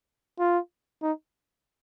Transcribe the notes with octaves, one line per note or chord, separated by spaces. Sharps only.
F4
D#4